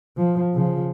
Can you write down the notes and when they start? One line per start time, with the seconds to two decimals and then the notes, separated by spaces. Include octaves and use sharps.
0.17 F3
0.54 C#3 F3